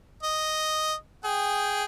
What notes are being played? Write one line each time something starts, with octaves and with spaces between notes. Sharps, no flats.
D#5
G#4 G5